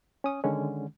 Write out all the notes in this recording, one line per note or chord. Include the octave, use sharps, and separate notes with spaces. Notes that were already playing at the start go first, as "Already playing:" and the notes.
C#4 D#6
D3 D#3 G#3 C#4